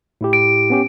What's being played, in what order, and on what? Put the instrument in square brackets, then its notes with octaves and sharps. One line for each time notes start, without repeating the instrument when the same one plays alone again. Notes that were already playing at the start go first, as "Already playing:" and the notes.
[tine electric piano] A2 E4 G4
[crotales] D7
[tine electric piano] B3 C#4 G4